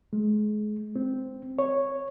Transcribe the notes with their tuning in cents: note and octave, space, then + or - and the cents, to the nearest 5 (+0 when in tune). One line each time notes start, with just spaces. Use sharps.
G#3 +30
C4 -5
C#5 -5